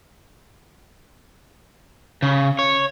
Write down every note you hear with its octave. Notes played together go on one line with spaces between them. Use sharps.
C#3
C#5